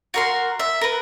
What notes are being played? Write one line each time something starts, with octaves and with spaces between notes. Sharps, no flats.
F#4 A#4 C6
E5
A#4 B4